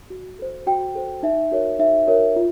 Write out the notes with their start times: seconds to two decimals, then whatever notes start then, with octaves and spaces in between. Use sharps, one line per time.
0.10 F#4
0.39 A4 C5
0.67 F#4 G5
0.95 A4 C5
1.23 D#4 E5
1.52 F#4 A#4 C#5
1.79 D#4 E5
2.07 F#4 A#4 C#5
2.36 F4